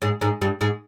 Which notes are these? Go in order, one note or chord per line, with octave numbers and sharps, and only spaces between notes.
G#2 G#3
G#2 G#3
G2 G3
G#2 G#3